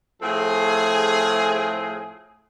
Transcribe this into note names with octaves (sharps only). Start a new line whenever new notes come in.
A2 F3 A3 C4 G#4